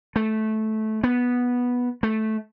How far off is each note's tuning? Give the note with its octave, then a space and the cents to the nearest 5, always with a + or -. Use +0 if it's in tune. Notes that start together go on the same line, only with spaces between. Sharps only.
A3 -15
B3 -10
A3 -10